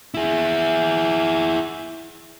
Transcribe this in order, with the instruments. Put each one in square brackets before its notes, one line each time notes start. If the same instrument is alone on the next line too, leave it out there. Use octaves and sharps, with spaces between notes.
[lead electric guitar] E4 G#4